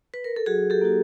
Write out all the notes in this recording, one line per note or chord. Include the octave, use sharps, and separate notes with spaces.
B4
A#4
A4
F#3 F#4 G#4
G4 A4
A#3 D#4 F#4